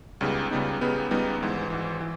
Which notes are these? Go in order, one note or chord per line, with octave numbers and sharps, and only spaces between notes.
C#2 C#3 G3 B3 D#4
C#2 C#3 G3 B3 D#4
C#2 C#3 G3 B3 D#4
C#2 C#3 G3 B3 D#4
G#1 G#2 E3
G#1 G#2 E3
E3